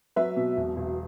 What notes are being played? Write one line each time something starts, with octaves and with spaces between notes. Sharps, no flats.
F#3 B4 E5
B2
E1
E1